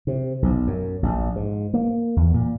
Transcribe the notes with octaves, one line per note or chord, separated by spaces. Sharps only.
C3
B1
F#2
A#1
G#2
A#3
E2
A#2